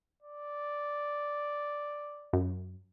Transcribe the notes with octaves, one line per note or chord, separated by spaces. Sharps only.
D5
F#2